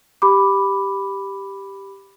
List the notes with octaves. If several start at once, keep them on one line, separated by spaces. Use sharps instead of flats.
G4 B5 D6